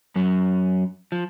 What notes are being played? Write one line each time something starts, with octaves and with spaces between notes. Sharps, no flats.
F#2 F#3
F3